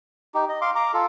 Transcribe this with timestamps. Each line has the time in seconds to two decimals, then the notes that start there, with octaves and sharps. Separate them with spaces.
0.34 D#4 G4
0.49 D#5
0.61 F5 C6 D6
0.75 A#5 D6
0.94 F4 A4